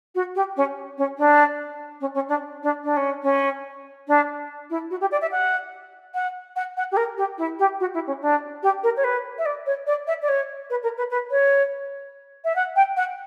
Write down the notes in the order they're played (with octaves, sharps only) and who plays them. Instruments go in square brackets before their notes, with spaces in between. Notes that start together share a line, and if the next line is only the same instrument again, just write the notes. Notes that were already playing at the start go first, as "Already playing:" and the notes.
[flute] F#4
G4
C#4
C#4
D4
C#4
C#4
D4
D4
D4
C#4
C#4
D4
E4
F#4
G4
D5
E5
F#5
F#5
F#5
F#5
G4
A#4
G4
E4
G4
F#4
E4
C#4
D4
G4
A#4
C#5
B4
E5
D5
C#5
D5
E5
D5
C#5
B4
A#4
B4
B4
C#5
E5
F#5
G5
F#5